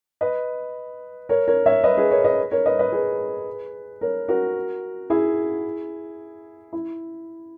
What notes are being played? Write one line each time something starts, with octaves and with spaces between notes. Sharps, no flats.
B4 D#5
A#4 C#5
A#4 C#5
C#5 E5
B4 D#5
G#4 B4
A#4 C#5
B4 D#5
A#4 C#5
B4 D#5
B4 D#5
G#4 B4
A#4 C#5
F#4 A#4
E4 G#4
E4